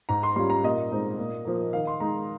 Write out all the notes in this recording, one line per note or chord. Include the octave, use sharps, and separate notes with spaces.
G#2 A#5
C6
G3 C#4 F4 C6
A#5
A#2 D#5
G#3 C4 D#4
A#2
F3 A#3
D#3 F5
C6
G#3 D#4 A#5